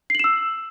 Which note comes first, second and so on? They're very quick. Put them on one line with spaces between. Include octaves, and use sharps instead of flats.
C7 F#7 E7 E6